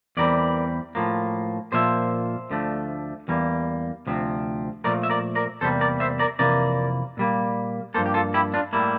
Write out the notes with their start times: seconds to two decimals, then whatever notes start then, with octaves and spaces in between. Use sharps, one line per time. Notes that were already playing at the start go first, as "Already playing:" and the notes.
0.17 E2 E3 G3 C4 A#4 D5
0.95 A2 F3 A#3
1.72 A#2 F3 A#3 C5 E5
2.50 D2 D3 F3 A3
3.28 E2 E3 G3 A#3
4.07 D2 C3 F3 C4
4.84 A#2 F3 A3 A#4 D5
5.03 E5
5.10 A#4 D5
5.35 A#4 D5
5.61 E2 C3 G3 A#3 A4 C5
5.81 A#4 D5
6.00 C5 E5
6.19 A#4 D5
6.39 F2 C3 E3 A#3 A#4 D5
7.17 A#2 G3 A#3
7.94 G2 F3 A#3 A4 C5
8.06 G4
8.14 F4 A4
8.34 E4 G4
8.54 D4 F4
8.73 A2 G3 A#3 E4